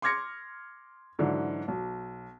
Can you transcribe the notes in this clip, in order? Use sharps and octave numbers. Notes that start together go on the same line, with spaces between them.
C6 D6 F6 G#6 A#6 C#7
G#2 D3 E3 F#3
B1